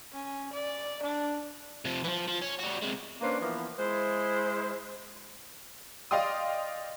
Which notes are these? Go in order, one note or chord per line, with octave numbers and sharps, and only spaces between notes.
C#4
D5
D4
C3 F3
E3 F3
F3
C#4
G3 F#4
C3 G#3
A#3 C#4 D4 B4 C5
E3 F3 A#3 B3
G#3 E4 C5
D5 D#5 F5 G5 C6 D#6